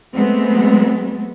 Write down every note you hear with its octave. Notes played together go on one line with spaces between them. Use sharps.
F#3 G#3 A3 B3 C4